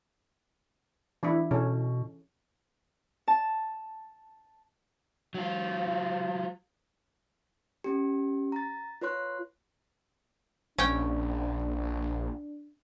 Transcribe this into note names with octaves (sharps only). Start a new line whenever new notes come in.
E3 D4 E4
B2 C#4 A4
A5
F#3 F4
C#4 G4
A#5 A6
F4 B4 C#5 C6 F#6
A#1 C#4 D4 G5